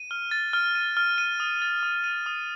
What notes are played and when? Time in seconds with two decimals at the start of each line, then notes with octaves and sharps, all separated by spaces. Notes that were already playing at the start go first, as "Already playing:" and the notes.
Already playing: D#7
0.11 F6
0.31 A6
0.53 F6
0.75 D#7
0.97 F6
1.18 D#7
1.40 D#6
1.62 A6
1.83 D#6
2.04 D#7
2.26 D#6